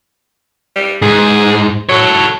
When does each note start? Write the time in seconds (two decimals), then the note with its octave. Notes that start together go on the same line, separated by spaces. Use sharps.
0.76 G3
1.02 G#2 G#4
1.89 F#3 A4 C#5